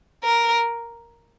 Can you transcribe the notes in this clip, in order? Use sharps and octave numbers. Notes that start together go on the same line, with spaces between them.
A#4